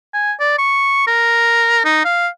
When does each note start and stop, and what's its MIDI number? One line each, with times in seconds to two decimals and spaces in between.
0.14 0.32 80
0.40 0.55 74
0.58 1.04 85
1.07 1.82 70
1.85 2.04 63
2.05 2.28 77